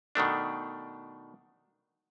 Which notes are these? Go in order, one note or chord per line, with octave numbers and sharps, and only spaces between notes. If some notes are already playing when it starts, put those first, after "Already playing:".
B2 D#3 A3 D4